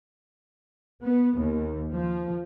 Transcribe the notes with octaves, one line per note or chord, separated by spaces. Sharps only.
B3
D#2
F3